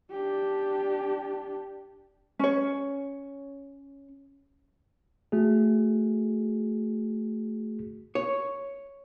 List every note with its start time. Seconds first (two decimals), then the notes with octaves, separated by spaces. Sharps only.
0.11 D4 G4
2.39 C#4 C#5
5.32 A3 F#4 G#4
8.15 C#5